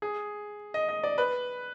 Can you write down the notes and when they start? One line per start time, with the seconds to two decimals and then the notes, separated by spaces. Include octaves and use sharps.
0.02 G#4
0.74 D#5
0.89 D#5
1.03 D5
1.18 B4